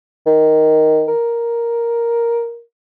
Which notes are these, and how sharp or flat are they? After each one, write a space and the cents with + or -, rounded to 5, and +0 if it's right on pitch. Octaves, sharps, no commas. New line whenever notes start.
D#3 +5
A#4 +5